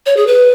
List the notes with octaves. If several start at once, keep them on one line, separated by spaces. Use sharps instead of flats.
C#5
G#4
B4